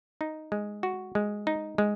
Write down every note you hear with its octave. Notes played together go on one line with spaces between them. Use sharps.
D#4
G#3
F#4
G#3
D#4
G#3